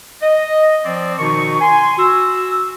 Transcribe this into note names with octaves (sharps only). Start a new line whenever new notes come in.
D#5
F3 C4 D5
B2 D#3 D#4 C#6
G#5 C6
F#4 E6